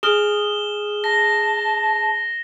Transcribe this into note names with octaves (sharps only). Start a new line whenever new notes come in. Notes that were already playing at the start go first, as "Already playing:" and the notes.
G#4 F6 E7 G7
A5 A#6